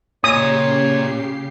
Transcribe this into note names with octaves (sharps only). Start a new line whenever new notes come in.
A#2 C#3 G4 C#5 D#6 C7